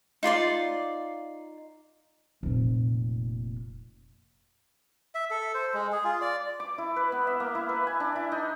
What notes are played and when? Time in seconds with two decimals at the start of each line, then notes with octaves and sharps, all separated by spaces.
0.23 D#4 F4 D5 C6
2.43 F1 A#2
5.15 E5
5.31 A4
5.54 C5
5.74 G#3
5.92 G#4
6.04 F4
6.21 D5
6.60 D6
6.78 E4
6.96 B4
7.12 B3
7.27 E5
7.40 A#3
7.55 E4
7.69 B4
7.87 G#5
8.00 D4
8.16 E4
8.32 D#4